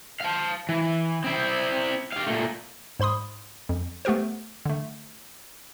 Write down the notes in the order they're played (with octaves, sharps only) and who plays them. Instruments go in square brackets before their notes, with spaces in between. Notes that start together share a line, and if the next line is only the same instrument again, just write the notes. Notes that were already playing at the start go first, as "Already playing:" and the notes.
[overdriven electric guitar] F5 A5
E3
C4 E4
G4 F5
A#2 A3
[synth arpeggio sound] G#2 C5 B5 C6 D#6
F2
A3 B3 G4 A#4 C5
D3 A3